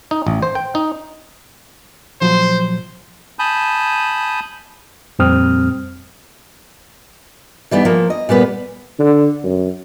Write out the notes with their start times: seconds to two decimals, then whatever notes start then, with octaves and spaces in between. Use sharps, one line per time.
0.11 D#4
0.27 A1
0.42 C5
0.55 G5
0.75 D#4
2.21 A#2 F3 F#3 C5
3.39 G#5 A5 B5 D#6 G6
5.19 F2 A#2 G3 C4 D#6 F6
7.71 E3 G3 B3 D#4
7.85 F3 A#3
8.10 D#5
8.29 A#2 G3 B3 B4
8.99 D3
9.43 F#2